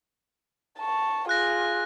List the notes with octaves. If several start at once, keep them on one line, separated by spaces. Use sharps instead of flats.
A5 C#6
F4 G#4 F#6 A#6